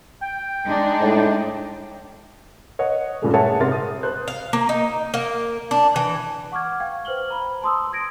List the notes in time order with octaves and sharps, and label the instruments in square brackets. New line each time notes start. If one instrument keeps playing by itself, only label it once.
[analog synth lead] G5
[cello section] G#3 D4 D#4
[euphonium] A2
[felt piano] C#5 D#5 F#5
G2 A#2 C#3 G#3 A3
G#4 A#4 C#5 E5 F#5 A5
G#2 C3 A#4 C6 A6
D#6
B4 C5 F#6
[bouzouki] F5
A#3
D#4
A#3
D4
E3
[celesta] F#5 C#6 D6 F6 G#6
F5 G5 G#6
B4 C5 F6 F#7 G7
A#5 B5
A5 C6 D#6 E6
C6 D#6 G#6 A#6 D7